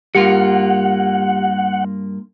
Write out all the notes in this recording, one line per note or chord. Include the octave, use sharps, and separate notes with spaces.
G2 A#3 F4 G4 F#5